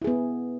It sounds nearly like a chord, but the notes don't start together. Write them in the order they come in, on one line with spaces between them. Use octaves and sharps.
E4 G#4 B3